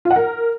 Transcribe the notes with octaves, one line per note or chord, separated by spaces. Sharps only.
F4
F#5
A#4